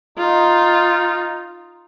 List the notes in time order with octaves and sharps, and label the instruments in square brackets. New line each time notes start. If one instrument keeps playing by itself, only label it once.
[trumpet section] D#4 [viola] F4